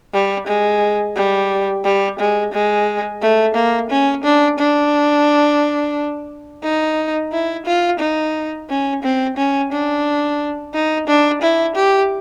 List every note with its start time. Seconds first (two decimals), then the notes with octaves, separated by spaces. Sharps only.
0.13 G3
0.47 G#3
1.16 G3
1.84 G3
2.19 G#3
2.52 G#3
3.22 A3
3.55 A#3
3.90 C#4
4.24 D4
4.59 D4
6.63 D#4
7.32 E4
7.66 F4
8.00 D#4
8.69 C#4
9.03 C4
9.37 C#4
9.72 D4
10.74 D#4
11.07 D4
11.42 E4
11.76 G4